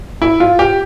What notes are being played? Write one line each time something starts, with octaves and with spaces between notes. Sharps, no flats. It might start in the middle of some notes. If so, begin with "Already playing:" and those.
E4
F4
G4